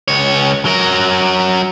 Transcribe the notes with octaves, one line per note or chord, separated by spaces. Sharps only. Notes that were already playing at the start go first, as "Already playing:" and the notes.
C#2 C#5
F#3 A#4